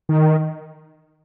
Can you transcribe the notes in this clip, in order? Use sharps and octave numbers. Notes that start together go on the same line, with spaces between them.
D#3